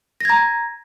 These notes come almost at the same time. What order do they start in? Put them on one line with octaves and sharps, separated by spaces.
A#6 G#6 A#5